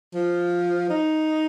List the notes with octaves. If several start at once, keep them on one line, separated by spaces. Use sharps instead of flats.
F3
D#4